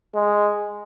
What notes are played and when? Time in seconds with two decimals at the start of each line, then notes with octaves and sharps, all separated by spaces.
0.15 G#3